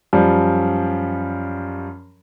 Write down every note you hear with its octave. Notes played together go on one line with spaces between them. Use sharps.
F#2 F3 G3